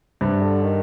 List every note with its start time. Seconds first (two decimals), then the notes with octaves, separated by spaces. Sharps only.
0.21 G2 C3
0.42 D3
0.63 D#3